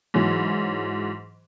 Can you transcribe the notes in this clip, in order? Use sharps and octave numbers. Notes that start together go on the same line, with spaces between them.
G#2 E3 F#3